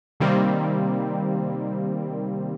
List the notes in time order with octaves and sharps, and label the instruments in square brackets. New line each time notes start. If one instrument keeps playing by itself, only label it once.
[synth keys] C3 D#3 G3 A#3 C4